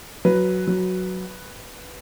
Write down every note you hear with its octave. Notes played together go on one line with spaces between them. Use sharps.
F#3 B4
F#3